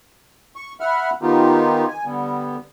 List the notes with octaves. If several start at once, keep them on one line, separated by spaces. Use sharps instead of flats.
C#6
E5 F#5 B5 F6
D#3 B3 D#4 F4 G4
G#5
D3 G3 B3